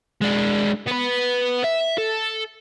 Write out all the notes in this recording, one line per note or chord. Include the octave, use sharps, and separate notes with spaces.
G#3 D4
B3 B4
E5
A4